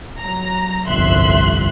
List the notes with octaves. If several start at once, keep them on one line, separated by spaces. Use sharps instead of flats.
F#3 A#5
G1 C2 F2 E5 C6 F#6